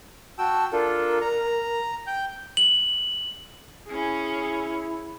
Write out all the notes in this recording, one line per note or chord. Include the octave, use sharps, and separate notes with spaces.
F#4 G5 A5 E6
D4 F4 A4 A#4
A#5
G5 G6
F#7
C#4 E4 G#4